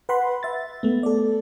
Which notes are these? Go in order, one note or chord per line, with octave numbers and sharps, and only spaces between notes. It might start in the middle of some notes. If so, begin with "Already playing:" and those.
B4 F#5 B5 C6
E5 A6
A3 B3
A4 D5